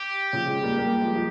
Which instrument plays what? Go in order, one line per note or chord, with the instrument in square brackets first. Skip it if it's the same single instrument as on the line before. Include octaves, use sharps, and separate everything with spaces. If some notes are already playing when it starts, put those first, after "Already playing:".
Already playing: [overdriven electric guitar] G4
[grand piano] C#3 F3
F3 G#3
G3 A#3
G3 A#3
F3 G#3
F3